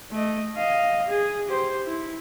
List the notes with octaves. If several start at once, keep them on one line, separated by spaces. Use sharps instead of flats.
A3 D#5
D#5 F5
G#4
G4 C5
E4